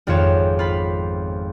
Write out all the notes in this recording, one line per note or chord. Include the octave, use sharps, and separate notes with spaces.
G#1 F2 B3 F4 C#5 E7
F4 B5